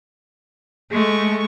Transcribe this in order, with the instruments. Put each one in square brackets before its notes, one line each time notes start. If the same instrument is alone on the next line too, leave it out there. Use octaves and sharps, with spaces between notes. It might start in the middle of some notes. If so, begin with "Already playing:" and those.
[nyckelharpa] G#3 C#6 [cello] A3